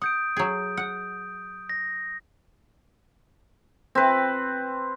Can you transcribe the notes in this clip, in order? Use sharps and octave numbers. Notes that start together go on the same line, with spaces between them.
F#5 D#6 G6 D7
F#3 G#4
F#5
A#6
C4 B4